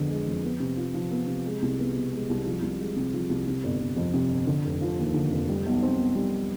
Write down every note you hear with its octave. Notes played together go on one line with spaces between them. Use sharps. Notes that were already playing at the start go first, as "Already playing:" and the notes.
Already playing: F2 D3 G#3 B3
G#3
F2
B3
C3
F4
F3
B3
C3
G#3
C2
B3
B2
G#3
C2
F3
C2
G#3
C3
F3
C2
C3
G1
G1
F2
C3
G1
D3
F1
F3
D#2
D3
F1
G3
B1
C4
B2
G3